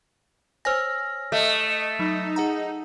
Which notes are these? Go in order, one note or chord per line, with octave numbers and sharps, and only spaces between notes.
C5 C#5 G#5 E6 F6 A#6
A3 D#5
F#3 D#4
G#4 F#5 A#5